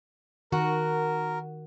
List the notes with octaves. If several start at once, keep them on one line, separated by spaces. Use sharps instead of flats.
D#3 F#4 A#4